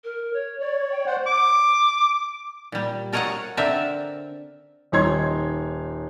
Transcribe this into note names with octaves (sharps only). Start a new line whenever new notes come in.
A#4
C#5
C#5 D5
G5
C5 D5 F#5
D6
A#2 G3
A4 A#4 C#5 D#5 F5 F#5
D3 C4 D4 A#4 E5
D#1 D#4 C#5 C6 G#6